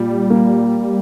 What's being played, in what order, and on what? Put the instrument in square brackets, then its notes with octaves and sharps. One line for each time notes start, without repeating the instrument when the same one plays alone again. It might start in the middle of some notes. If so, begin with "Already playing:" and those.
Already playing: [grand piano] A#2 [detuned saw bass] G3
[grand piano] A#3